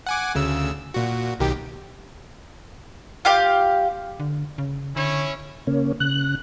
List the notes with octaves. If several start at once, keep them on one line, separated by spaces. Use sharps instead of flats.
F#5 G#5 D6
D2 C#3 E6
A#2 F#4
B1 D#3 G4
F4 G4 F5
D3
C#3
D3 C#4 E4 C#5
C#3 A#3 C#4
C#3 F#6